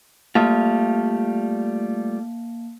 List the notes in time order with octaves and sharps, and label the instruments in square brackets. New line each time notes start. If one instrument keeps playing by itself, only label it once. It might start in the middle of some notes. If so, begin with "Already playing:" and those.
[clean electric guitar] G3 A3 F4 [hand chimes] A#3 F5 A5